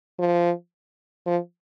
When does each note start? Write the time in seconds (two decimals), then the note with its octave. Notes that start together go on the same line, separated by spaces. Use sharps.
0.19 F3
1.27 F3